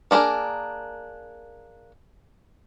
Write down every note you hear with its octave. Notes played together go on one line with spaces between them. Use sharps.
A#3 D4 F#4 G#4 A#4